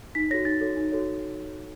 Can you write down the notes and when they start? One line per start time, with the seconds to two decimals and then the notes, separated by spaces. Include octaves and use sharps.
0.15 D#4 B6
0.31 F#4 A4 C#5 A#6
0.45 D#4 A6
0.61 F#4 A4 C#5
0.77 D#4
0.92 F#4 A4 C#5